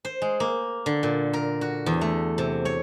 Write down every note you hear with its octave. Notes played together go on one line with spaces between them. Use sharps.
C5
G#3
A#3
D3
A#2
A#4
F#4
E2
A3
C3
C#5